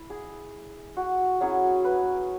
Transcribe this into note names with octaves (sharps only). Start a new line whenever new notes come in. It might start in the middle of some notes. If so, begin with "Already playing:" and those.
Already playing: E4
G#4
F#4
F#3 C#4 E4 G#4
B4